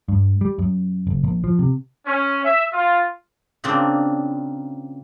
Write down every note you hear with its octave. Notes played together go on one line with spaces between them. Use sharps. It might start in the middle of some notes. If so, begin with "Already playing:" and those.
G2
G3
F#2
F#1
A#1
F3
C3
C#4
E5
F4
A#2 C#3 A#3 C4 D4